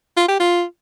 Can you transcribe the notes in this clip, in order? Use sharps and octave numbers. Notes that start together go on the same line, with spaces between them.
F4
G4
F4